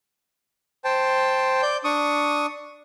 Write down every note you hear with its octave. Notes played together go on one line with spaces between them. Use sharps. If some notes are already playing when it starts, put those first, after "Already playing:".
C5 G5 A5
D5 G6
D4 C#6 D#6